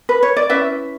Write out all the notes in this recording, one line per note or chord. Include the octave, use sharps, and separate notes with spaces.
B4
C#5
D5
C#4 E4 B4 E5